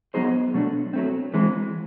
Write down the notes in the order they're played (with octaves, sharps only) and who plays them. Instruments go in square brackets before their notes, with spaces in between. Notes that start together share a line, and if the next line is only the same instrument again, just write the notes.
[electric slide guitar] F#3 B3 D#4 G#4 C5
B2 F#3 A3 D4
F#3 A3 C4
E3 G#3 C4